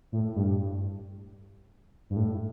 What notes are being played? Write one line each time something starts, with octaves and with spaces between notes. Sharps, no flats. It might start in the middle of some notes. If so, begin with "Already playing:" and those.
A2
G2
G2
A2